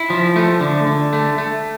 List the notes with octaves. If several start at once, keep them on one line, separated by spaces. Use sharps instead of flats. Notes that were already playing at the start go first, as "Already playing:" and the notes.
Already playing: E4
F3
A3
D3
D3
A3
A3